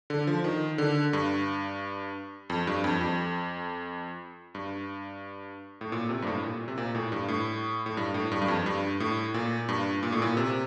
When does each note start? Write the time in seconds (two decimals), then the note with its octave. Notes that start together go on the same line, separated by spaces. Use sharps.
0.10 D3
0.27 F3
0.44 D#3
0.78 D3
1.13 G2
2.50 F2
2.67 G2
2.84 F2
3.01 F2
4.55 G2
5.81 A2
5.92 A#2
6.09 C3
6.22 G2
6.27 A2
6.43 A#2
6.68 C3
6.78 A#2
6.95 A2
7.12 G2
7.28 A2
7.86 A2
7.97 G2
8.14 A2
8.32 G2
8.42 G2
8.48 F2
8.66 G2
9.00 A2
9.34 A#2
9.69 G2
10.03 A#2
10.12 A2
10.22 A#2
10.37 C3